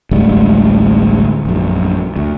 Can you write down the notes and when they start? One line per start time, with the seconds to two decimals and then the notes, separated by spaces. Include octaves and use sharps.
0.11 A1 D2 G3 G#3
1.45 A#1 F#2
2.16 D2